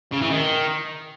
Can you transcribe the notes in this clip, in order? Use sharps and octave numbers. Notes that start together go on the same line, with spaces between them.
C#3
E3
D#3